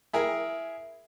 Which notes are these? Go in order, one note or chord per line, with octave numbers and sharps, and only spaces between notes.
E4 G#4 A#4